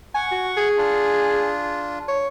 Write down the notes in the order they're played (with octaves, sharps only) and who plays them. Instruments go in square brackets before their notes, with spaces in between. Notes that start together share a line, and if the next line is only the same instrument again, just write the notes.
[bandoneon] F#5 C#6 [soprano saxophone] G#5
[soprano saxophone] F#4
G#4
[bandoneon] D4 F4
[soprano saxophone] C#5